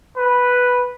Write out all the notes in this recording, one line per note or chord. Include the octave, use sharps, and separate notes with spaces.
B4